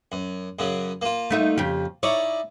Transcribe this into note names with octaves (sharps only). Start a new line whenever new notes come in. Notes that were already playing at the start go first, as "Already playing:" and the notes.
F#2
F#2 C#3 F#3
A#3 F4
A3 D#4 E5
F2 C#3 G4
D#4 E4 C#5 D5